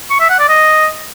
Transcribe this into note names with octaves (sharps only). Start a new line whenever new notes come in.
C#6
E5
F#5
D5
D#5